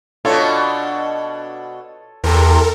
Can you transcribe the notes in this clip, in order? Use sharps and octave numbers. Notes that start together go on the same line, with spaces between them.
B2 D4 F4 A4 C#5
E2 C3 A4 A#4